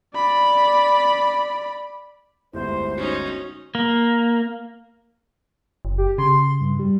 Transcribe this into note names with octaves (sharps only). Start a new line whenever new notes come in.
D5 B5
G1 D2 G#2 E4 G4 C5 E5
C#4 D#4 F#4 C#5
A#3
F#1
G4
C#3 C6
G2
G3